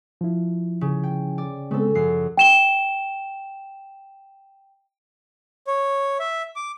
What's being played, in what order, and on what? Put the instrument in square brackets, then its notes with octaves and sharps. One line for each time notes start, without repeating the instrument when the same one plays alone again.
[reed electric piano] F3 E4
[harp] C#3
G5
D5
[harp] C#3 A4 [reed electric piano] G#3 B3 C4
[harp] F#2 C7 [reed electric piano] F3
[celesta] G5 E7 G7
[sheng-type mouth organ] C#5
E5
D6